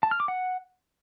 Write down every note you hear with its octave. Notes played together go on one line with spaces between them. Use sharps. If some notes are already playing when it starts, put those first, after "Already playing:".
A5
F6
D6
F#5